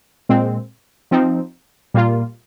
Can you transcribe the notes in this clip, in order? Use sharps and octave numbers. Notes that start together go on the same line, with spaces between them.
A#2 G#3 C4
F3 C4 D#4
A#2 G3 A#3 F4